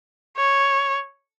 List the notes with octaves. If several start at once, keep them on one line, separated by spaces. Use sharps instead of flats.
C#5